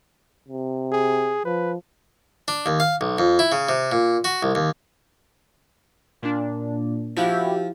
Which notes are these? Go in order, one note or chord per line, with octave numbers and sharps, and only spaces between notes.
C3
G#4
F3 B4
D4
D#2
F5
B1
F2
E4
C#3
C3
A#2
F#4
C2
D#2
A#2 D4
F3 E4 F#4 G4